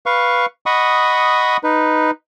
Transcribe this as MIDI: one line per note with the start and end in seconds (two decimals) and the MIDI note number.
0.06 0.46 71
0.06 0.46 77
0.06 0.46 85
0.66 1.57 75
0.66 1.57 78
0.66 1.57 83
0.66 1.57 85
0.66 1.57 87
1.63 2.11 63
1.63 2.11 71